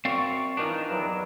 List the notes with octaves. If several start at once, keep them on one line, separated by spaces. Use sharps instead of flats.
F#2 C4 D5 F5 C#6
D#3 E3 D4 D#4 F4
E2 G2 F#3